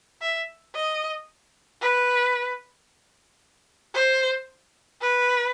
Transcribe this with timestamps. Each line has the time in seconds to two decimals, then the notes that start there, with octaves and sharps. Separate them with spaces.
0.21 E5
0.75 D#5
1.81 B4
3.94 C5
5.01 B4